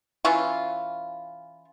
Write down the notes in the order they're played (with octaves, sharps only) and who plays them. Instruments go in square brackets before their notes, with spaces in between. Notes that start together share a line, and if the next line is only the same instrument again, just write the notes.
[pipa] E3 C#4 F4